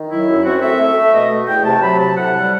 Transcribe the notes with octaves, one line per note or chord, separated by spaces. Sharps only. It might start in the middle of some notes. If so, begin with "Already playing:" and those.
Already playing: D#3
F#3 E4
F#2
C4 F#4
A3 E5
A3
A3
B2 D#5
A3
E2 G5
C3 A5
F#3 B5
C3 A5
A2 F#5
G3